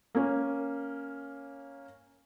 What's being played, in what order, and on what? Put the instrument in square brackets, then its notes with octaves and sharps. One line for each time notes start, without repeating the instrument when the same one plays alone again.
[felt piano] A#3 C#4